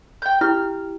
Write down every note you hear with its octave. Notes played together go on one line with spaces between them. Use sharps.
G5 G6
E4 G4 F6